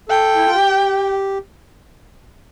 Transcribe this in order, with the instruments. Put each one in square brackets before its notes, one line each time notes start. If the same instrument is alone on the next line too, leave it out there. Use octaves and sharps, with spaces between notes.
[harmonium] A4 [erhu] G5
[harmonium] E4
F4
G4